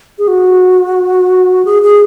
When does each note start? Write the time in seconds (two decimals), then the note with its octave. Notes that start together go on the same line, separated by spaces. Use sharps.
0.19 G#4
0.28 F#4
1.65 G#4
1.83 G#4